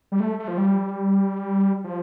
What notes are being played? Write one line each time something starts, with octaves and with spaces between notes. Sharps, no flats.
G3
A3
A3
F3
G3
F3